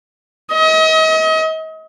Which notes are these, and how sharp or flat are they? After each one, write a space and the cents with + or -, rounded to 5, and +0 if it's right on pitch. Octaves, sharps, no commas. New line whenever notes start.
D#5 +35